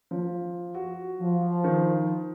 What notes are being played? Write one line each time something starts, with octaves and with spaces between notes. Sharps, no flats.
F3
F#4
F3
D#3